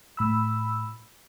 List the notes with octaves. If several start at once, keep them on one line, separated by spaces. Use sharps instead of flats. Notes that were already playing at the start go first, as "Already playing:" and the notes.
A2 B5 E6